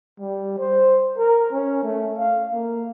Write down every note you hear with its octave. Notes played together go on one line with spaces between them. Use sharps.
G3
C5
A#4
C#4
A3
F5
A#3